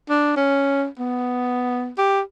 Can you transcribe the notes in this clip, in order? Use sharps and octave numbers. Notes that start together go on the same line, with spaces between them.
D4
C#4
B3
G4